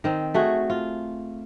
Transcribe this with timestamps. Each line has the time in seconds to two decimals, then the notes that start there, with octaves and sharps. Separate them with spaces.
0.04 D#3 C4
0.34 A3 F#4 G#4
0.70 F4